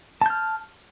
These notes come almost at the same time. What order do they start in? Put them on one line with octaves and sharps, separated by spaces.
A5 G6 F6